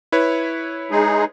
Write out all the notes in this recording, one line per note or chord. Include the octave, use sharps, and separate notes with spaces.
E4 B4 C#5
G#3 D#4 G#4